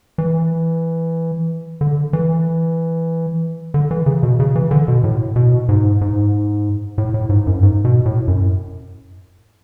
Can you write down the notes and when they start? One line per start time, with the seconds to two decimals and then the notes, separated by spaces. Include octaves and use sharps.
0.18 E3
1.81 D3
2.13 E3
3.74 D3
3.91 E3
4.06 C#3
4.23 B2
4.40 C#3
4.56 E3
4.71 D3
4.88 B2
5.04 A2
5.36 B2
5.69 G#2
6.01 G#2
6.98 A2
7.14 A2
7.29 G#2
7.47 F#2
7.63 G#2
7.85 B2
8.06 A2
8.28 F#2